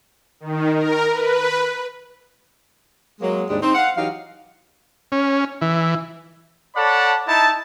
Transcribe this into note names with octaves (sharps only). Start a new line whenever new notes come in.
D#3
A#4
B4
F#3 G#3 A#3
D#2 G#2 G3 G#3 D4 G4
C4 D#4
F5 F#5
E3 F#3 D#4 G4 F5
C#4
E3
A4 C#5 D5 F#5 A5 B5
D#4 E4 A5